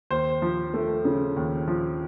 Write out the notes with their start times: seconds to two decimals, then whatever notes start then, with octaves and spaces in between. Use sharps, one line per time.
0.11 D#2 C5
0.42 F3
0.74 A3
1.05 C#3
1.36 D#2
1.68 F3